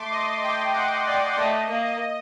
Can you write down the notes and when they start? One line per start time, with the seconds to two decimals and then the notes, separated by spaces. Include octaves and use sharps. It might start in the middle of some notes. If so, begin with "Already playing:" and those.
Already playing: A3 C6 D6
0.12 D#5
0.43 G5
0.74 F#5
1.07 D5
1.37 A3 D#5
1.70 A#3
1.85 D#5